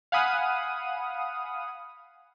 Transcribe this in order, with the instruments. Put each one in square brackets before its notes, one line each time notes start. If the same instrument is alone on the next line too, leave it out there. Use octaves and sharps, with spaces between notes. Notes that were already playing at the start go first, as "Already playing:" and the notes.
[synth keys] F5 F#5 G#5 B5 D#6